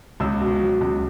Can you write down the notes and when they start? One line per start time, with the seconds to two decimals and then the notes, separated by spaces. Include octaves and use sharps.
0.20 C#2 E6
0.40 B2
0.61 F#3
0.81 C#2